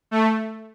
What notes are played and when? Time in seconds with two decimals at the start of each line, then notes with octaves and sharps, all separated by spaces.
0.11 A3